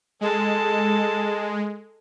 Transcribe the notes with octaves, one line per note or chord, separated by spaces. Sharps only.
G#3 A4 A5